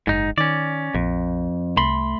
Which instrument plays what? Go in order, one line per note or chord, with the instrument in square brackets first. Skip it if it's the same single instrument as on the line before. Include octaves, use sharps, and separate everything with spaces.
[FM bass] F#1 [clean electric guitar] G#2 D#4
[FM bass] D#3 [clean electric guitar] C#4 D5
[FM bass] A#1 [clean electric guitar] F2
[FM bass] C2 [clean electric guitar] A3 B5 C6